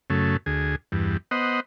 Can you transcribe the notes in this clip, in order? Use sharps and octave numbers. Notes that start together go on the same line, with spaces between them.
F#2 C#3 A3
D2 G#4
E2 G2
B3 C5 D#5 F#5